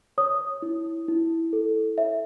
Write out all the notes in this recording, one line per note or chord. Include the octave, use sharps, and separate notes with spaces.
C#5 D#6
E4
E4
A4
C#5 E5